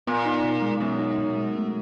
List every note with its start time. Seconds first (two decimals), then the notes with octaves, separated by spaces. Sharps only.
0.07 A#2 B3
0.26 D#4
0.44 B2
0.62 G#3
0.80 F#2 B3
0.99 D#4
1.18 B2
1.37 G#3
1.55 A3